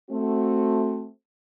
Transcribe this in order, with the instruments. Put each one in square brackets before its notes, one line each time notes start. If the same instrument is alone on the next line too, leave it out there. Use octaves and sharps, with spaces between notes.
[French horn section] A3 C4 F#4